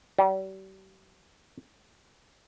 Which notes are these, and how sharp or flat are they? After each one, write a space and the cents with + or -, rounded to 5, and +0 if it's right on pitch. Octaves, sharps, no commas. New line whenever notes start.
G3 -40